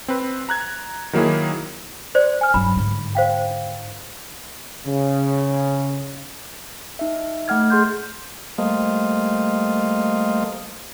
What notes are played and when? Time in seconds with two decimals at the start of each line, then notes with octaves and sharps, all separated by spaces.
0.08 C4 B4
0.49 A#5 F#6 G#6
1.13 D#3 F#3 A#3 E4 G#4
2.15 C5 D5
2.41 G#5 F6
2.54 G2 F#3 B5
2.76 G#2 D3
3.15 C5 F5 G5
4.86 C#3
6.99 D#4 E5
7.48 A3 F#5 F6 G#6
7.70 G#4 C6 G6
8.58 G3 A3 A#3 C5 D#5 F5